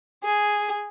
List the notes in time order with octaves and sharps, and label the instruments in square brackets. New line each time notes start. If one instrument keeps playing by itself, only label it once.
[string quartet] G#4